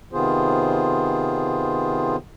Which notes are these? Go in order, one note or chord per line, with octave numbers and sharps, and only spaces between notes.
C3 D#3 B3 F4 G#4 C5